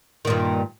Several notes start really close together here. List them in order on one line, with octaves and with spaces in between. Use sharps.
D#3 A#2 G2